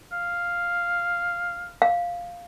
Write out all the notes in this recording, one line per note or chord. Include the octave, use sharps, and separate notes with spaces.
F5
F5